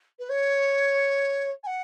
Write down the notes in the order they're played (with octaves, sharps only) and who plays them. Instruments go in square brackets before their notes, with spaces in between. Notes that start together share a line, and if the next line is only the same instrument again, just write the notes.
[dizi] B4
C#5
G#5
F#5